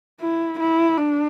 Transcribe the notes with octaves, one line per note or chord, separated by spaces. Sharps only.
E4
E4
D4